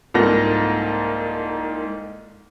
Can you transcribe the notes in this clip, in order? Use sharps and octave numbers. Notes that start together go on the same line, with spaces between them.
C2 G#2 A#3 F4 A4 A#6